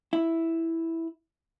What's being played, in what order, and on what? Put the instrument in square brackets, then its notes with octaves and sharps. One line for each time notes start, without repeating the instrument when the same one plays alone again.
[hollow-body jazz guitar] E4